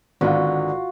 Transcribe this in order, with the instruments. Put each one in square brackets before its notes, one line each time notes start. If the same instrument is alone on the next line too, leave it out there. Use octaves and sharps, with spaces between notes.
[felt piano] G#1 [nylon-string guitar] G#2 D3 B3 [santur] F4 F#4